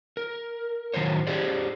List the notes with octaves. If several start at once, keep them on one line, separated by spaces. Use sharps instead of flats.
A#4
A2 D#3 F#3 C5 C#5
G4 G#4 C5 D5